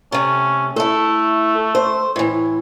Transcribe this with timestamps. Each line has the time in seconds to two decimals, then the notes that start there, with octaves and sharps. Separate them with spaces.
0.12 C3 A3 C#4
0.76 A3 E4 A4
1.75 C5
2.16 A2 E3